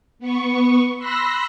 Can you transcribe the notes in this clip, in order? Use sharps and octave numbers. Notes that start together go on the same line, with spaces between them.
B3 C#6
B5 C6 E6 F#6 A#6